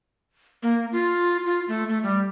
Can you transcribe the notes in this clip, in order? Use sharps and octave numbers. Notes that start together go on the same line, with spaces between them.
A#3
F4
F4
A3
A3
G3